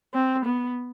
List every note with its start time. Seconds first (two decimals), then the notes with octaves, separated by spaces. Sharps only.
0.14 C4
0.46 B3